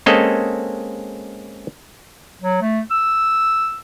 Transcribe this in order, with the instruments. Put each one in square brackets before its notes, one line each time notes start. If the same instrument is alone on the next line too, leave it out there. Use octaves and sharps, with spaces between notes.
[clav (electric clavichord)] G#3 A#3 C4 C#4 A4 D#5
[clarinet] F#3
A3
E6